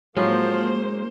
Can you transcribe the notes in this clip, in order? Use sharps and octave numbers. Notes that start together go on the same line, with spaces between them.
A2 F3 F#3 G#3 A#3 C#4 C5